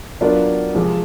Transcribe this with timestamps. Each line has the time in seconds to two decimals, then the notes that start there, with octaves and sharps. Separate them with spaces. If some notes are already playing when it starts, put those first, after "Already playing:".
0.21 F#3 B3 D4 F4 A#4
0.75 C3 F3 G#3